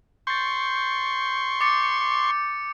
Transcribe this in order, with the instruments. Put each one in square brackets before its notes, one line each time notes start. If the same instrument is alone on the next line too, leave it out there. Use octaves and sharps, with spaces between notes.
[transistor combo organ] C6 C#6 [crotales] G6 A6
[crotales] D6 A6 C#7